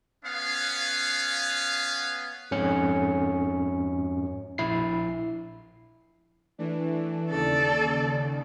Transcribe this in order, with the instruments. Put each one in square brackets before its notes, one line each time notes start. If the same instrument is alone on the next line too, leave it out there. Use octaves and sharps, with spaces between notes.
[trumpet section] B3 C#4 F5
[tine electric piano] F2 G#2 C#4 C#7
A#1 E4 C7
[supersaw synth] E3 A3 D4
[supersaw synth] D#2 C#3 [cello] A4 D5